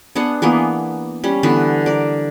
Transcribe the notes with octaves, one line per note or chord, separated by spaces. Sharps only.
B3 D4 G#4 F#5
E3 A#3 B3 G#4
G3 C#4
D3 E3 B3 B4
A#4 D5